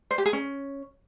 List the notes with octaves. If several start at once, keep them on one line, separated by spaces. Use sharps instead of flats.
C5
G4
G#4
C#4